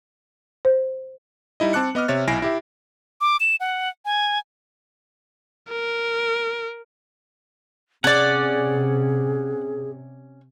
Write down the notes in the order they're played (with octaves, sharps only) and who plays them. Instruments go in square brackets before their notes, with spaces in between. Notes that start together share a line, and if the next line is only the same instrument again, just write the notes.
[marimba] C5
[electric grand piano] G3 D#4 E4 D#5
C4 A5 D6 F#6 C#7
B3 D#5 D6 F6
C3 C#5 E5 A6
B1 E4 G#5 A#6 C7 D7
E4 G4 E5
[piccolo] D6
E7
F#5
G#5
[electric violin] A#4
[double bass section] C3 [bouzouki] C#4 D5 [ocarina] G#4 [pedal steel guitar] F#5